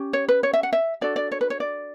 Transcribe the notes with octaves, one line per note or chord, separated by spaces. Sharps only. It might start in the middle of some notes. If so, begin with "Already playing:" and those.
Already playing: C#4 G4
C#5
B4
C#5
E5
F#5
E5
D4 F#4 A4 D5
D5
C#5
B4
C#5
D5